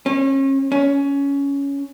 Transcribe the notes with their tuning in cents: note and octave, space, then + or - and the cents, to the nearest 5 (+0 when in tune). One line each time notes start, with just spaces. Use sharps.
C#4 -35
C#4 +15